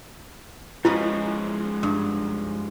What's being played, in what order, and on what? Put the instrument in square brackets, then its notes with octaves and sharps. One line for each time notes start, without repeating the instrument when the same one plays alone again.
[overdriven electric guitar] G#2 F3 [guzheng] C#4 B4 D#5 [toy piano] E4
[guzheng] G2